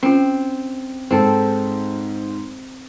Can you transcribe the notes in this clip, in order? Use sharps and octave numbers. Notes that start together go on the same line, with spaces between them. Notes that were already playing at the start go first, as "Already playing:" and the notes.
C4 C#4 F4
G#2 C4 A4